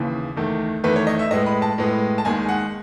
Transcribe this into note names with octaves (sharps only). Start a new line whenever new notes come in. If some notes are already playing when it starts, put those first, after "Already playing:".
Already playing: D#2 C#3 E3
E2 D#3 A3
E2 D#3 A3 B4
C#5
D#5
E5
A2 G#3 B3 D#5
B5
A5
A2 G#3 B3
A5
D#2 D#3 G#3 G#5
F#5